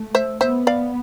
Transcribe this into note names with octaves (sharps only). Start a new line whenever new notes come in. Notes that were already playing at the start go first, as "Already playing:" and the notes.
Already playing: A3
C5 E5
B3 C5 E5
D5 F5